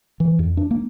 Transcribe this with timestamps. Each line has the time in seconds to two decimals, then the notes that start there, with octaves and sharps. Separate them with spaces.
0.20 E3
0.39 F2
0.57 D4
0.71 A#3